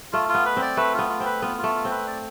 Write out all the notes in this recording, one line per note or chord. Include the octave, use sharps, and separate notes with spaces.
A3 F4
F4
B3
B4
C4
D5
A3 B4
B3 F4
F4
C4 B4
B3 F4
F4
A3
F4
C4
B4
D5